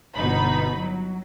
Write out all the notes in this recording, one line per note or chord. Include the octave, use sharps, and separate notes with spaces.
G1 B2 D#4 B5
F#3